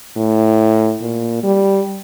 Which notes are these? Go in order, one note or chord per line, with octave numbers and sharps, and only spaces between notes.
A2
A#2
G3